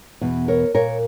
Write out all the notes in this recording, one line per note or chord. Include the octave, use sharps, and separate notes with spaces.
E2 B2
A#4 C#5
A#2 A#4 C#5